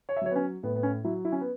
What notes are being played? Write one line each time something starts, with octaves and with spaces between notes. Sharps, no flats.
C#5
E5
F#3 C#5
B3
C#4
A2 B3
B3
C#4
F#3 E4
E4
C#4
B3